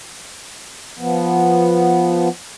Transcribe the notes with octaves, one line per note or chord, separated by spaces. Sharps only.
F3 B3